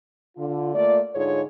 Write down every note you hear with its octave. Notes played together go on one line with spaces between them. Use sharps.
D3 F4
A3 A#3 F4 D5
G#2 D3 D#4 F4 G#4 C#5